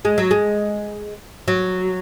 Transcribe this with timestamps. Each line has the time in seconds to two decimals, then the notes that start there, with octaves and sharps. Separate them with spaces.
0.05 G#3
0.18 F#3
0.31 G#3
1.48 F#3